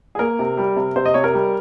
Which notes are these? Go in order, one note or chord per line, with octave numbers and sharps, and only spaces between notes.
G#4
A#3 A#4
C3
G3
C3
C3 C5
D#5
C3 C#5
A#4
G3